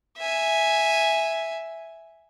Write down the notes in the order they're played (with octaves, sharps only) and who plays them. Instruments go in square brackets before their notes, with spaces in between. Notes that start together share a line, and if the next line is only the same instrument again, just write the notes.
[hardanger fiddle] E5 G#5